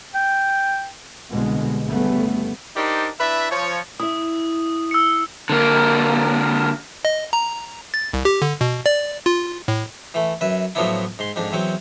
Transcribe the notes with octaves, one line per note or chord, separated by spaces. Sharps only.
G5
C2 B2 D3 G#3
G1 C#3 G3 A3 B3
D4 D#4 G4 A#4 C5 D5
D4 E4 B4 E5
F3 C#5
E4 E5 D#6
E6 C#7
D3 A#3
D#5
A#5
A6
C2
G4
D3
B2
D5
F4
A2
E3 A3
F#2 B4 E5
A2 F3 F#3 B3 D4 E4
G#2 C6
F2 G#2 D4
E2 F#3 C4